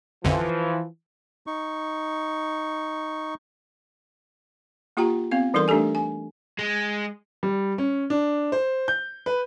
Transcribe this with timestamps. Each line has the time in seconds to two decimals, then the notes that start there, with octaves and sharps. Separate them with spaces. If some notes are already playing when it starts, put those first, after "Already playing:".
0.24 A1 F2 D3 E3 F3
1.47 D#4 C#6
4.97 A#3 F4 G4 G5 A#5
5.31 B3 C4 F5
5.54 E3 G3 D#4 A4 A#4 C6
5.68 A3 D4 G4 A4 G#5
5.95 G#5
6.59 G#3
7.43 G3
7.78 C#4
8.10 D4
8.52 C5
8.88 G6
9.26 B4